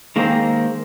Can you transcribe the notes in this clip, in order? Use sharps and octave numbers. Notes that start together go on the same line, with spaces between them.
D#3 G#3 A#3 C4